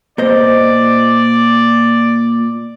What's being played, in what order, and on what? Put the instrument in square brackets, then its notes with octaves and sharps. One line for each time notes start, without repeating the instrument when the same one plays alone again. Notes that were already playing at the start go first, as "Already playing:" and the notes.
[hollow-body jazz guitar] A#2 C5 D#5 [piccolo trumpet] D5